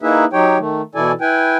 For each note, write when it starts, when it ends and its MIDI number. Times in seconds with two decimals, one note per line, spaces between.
0.02 0.25 58
0.02 0.25 63
0.02 0.25 64
0.02 0.25 68
0.02 0.25 71
0.02 0.25 76
0.33 0.58 54
0.33 0.58 63
0.33 0.58 67
0.33 0.58 73
0.33 0.58 79
0.58 0.82 51
0.58 0.82 57
0.95 1.12 47
0.95 1.12 52
0.95 1.12 64
0.95 1.12 69
0.95 1.12 74
0.95 1.12 80
1.21 1.58 64
1.21 1.58 71
1.21 1.58 79
1.21 1.58 80